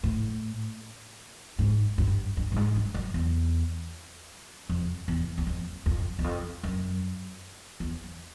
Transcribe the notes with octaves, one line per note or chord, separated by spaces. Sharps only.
A2
G#2
G2
G2
G2
G#2
G2
F#2
E2
F2
E2
E2
F2
F2
E2
F2
F#2
E2